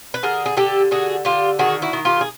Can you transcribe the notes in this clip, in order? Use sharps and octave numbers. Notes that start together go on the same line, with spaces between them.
B4
D3 G#4 A#4
G#4
D3 G4 A4
D3 F#4 G#4
D3 F4 G4
D#3 F#4 G#4
E4 F#4
D#3
F4 G4
G#4